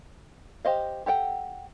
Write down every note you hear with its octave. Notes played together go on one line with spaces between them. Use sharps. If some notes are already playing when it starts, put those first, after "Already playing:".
G4 C5 D#5 F5
G4 A4 F#5 G5